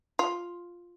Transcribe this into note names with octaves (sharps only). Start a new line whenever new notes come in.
F4